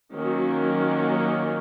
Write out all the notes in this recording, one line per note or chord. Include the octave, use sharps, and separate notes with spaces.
D#3 F#3 A#3 C#4